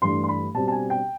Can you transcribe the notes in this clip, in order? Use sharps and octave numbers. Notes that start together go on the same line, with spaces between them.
G2 E3 A3 D4 C6
C6
B5
B2 G3 C4 A5
A5
G#5
G5